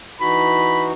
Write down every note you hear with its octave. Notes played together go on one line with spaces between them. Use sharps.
E3 D#4 F#4 B5